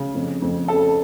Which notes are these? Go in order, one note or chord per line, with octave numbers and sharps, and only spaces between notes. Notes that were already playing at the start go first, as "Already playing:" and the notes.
Already playing: C#3
F2
F2
C#3 A4